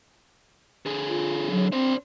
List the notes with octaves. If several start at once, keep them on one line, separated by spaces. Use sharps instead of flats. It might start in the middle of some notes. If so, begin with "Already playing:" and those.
D3 G#4
F4
F#3
C4 D4 C5